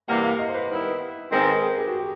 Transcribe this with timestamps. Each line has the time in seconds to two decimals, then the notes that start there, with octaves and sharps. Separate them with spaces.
0.08 C3 E3 G3 A#3 F#5
0.24 F5
0.39 D#5
0.48 C5
0.54 B4
0.70 D#3 G3 B3 E4
1.31 G#2 D#3 G#3 C4 A#4
1.42 B4
1.52 A#4
1.62 G#4
1.78 G4
1.87 F#4
1.97 G4